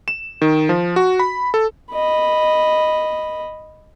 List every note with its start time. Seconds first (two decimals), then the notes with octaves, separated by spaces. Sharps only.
0.08 E7
0.42 D#3
0.69 F3
0.96 F#4
1.19 B5
1.54 A4
1.92 D#5 B5